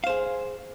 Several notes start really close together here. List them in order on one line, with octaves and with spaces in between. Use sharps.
F5 C5 G#4